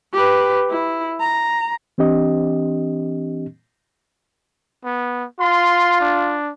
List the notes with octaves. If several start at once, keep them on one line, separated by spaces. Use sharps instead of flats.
G4 B4
E4
A#5
E3 C4 D4 G4 D#5
B3
F4 C6
D4